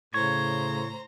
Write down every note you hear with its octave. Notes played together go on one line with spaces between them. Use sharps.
A2 C#3 C5 C#5 A#5